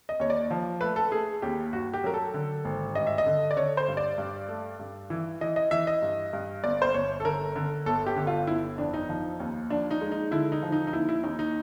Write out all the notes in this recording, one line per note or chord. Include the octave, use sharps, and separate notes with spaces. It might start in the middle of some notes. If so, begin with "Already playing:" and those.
D#5
D#2 C#5
D5
F3
A3 B4
A4
A3 G#4
D#2 G4
G2 F#4
G4
F#3 A#4
A4
D3
G#1
G2 D#5
E5
D#5
D3
D5
D3 C#5
C5
G2
D5
G2
A3
G2
E3
E3 D#5
D#5
E3 E5
D#5
G2
G2
G1 D5
C5
G1 C#5
A4
D3 A#4
D3
G1 A4
G4
D3
F4
G1 E4
F2 D4
D#4
F3
D#2
F3 D4
D#4
G#3
D#4
D3 E4
D#4
F3
D#4
D#4
D#2 E4
E4
D#2 D#4
D#4